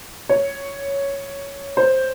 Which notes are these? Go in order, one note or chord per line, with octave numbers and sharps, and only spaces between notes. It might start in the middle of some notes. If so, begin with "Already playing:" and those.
C#5
C5